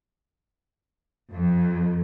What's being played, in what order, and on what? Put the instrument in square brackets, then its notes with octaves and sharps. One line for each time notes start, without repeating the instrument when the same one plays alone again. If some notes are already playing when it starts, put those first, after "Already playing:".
[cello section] F2